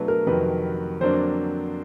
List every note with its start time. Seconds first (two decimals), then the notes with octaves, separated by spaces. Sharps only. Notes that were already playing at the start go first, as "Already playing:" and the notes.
Already playing: B2 F#3 A3 D4 B4
0.08 A#4
0.27 F2 C3 D#3 F#3 B4
1.01 F2 D3 F#3 A#3 D4 C5